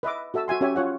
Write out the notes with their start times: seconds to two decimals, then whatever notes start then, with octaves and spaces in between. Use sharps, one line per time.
0.03 B4 D#5 E5 D6
0.34 F#4 A4 E5 A5 E6
0.48 F#4 E5 G#5 C6
0.61 C#4 F#4 G4 C#5 E5 G#5
0.76 F4 C#5 F#5